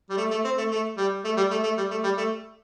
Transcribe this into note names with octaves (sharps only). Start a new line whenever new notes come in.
G3
A3
A3
C4
A3
A3
G3
A3
G3
A3
A3
G3
A3
G3
A3